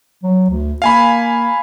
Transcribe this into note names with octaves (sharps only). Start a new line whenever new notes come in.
F#3
D2
A#3 F5 G#5 B5